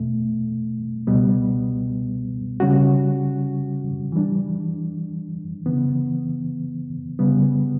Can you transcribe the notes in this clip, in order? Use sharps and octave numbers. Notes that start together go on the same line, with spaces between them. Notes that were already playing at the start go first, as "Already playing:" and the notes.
Already playing: E2 B2 A3
C#2 B2 G3 B3
C#3 G3 C#4 F#4
E3 G3 D4
C#3 E3 B3
C#3 G3 B3